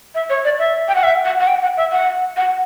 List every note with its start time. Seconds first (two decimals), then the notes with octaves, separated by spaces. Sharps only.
0.15 E5
0.30 C#5
0.45 D5
0.59 E5
0.88 G5
0.95 F#5
1.03 E5
1.25 F#5
1.40 F#5
1.47 G5
1.62 F#5
1.77 E5
1.92 F#5
2.37 F#5